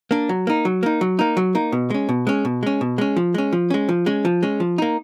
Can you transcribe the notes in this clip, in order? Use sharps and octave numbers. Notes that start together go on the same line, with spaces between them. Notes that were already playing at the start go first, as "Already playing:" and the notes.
A#3 D4
F#3
A#3 D#4
F#3
A#3 D#4
F#3
A#3 D#4
F#3
A#3 D#4
B2
G#3 C#4
B2
G#3 C#4
B2
G#3 C#4
B2
G#3 C#4
F3
G#3 C#4
F3
G#3 C#4
F3
G#3 C#4
F3
G#3 C#4
F3
A#3 D#4